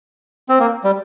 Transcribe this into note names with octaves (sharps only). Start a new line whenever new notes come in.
C4
A#3
G3